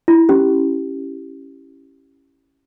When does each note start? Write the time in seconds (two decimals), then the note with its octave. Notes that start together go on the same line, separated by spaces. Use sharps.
0.08 E4
0.29 C#4 G4